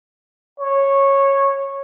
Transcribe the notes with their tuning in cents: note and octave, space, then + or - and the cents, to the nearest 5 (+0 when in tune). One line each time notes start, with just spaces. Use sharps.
C#5 -10